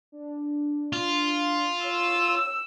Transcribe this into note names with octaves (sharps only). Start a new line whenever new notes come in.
D4
F4
C#5 E6